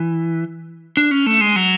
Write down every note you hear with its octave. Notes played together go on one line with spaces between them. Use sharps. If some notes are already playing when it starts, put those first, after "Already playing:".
Already playing: E3
D4
C#4
A3
G#3
F#3